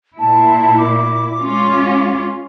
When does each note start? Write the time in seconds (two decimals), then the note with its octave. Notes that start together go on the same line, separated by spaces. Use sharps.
0.19 A#2 E4 A5
0.78 D6
1.41 G#3 C#4 F4